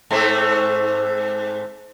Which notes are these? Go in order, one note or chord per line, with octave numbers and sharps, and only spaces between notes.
G#2 A3 C4